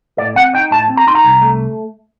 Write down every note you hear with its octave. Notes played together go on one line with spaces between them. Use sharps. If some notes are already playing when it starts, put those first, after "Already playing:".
A2 D5
C4 F#5
D#4 G5
A2 A5
C4
A#5
D#4 C6
A#5
C2
A3